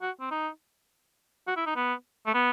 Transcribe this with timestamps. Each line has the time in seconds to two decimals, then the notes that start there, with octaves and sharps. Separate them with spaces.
0.02 F#4
0.20 C4
0.31 D#4
1.47 F#4
1.56 E4
1.66 D#4
1.76 B3
2.26 A3
2.34 B3